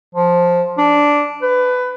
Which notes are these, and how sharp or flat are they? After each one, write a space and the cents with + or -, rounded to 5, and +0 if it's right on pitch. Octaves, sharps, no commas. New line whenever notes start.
F3 +10
D4 -5
B4 +20